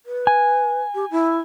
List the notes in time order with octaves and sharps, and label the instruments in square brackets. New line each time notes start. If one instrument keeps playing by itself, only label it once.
[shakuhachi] B4
[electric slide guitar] G#5
[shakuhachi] G4
E4